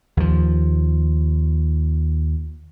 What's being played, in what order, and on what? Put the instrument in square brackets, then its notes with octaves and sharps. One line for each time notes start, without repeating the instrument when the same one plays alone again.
[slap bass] D#2 F3